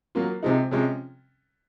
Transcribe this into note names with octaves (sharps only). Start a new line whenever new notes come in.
F#3 A#3 F4
C3 F3 G#3 D#4
C3 F3 G#3 C#4